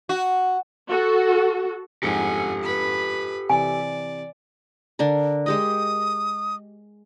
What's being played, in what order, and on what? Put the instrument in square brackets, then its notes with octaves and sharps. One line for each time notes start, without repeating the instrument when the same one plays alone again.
[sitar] F#4
[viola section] F#4 A4
[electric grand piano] F2 G#2 C#7 [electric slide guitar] G4 A4 [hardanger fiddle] F#5 G#5
[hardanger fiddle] B4 B5
[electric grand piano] C3 E3 [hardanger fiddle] D5 [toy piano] G#5
[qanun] D3 D4 A#4
[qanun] G#3 G4 D#5 [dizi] D#6